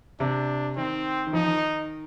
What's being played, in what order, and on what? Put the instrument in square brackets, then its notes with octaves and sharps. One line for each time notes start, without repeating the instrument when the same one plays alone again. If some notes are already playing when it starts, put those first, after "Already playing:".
[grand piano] C3 [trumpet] D4
[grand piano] D#3 [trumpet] C4
[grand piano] D#3
[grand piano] F3 [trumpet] D#4
[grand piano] D#3